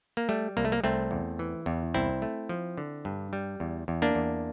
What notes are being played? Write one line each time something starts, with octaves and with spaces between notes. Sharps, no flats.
A#3
G3 A3
C2 A#3
A3
A#3
C2 A3 C4
E2
E3
E2
C2 C4 E4
A3
F3
D3
G2
G3
E2
E2
A#3 D4
E2